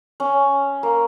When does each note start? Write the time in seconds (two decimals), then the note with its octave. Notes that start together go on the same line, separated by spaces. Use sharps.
0.20 C#4
0.83 A#3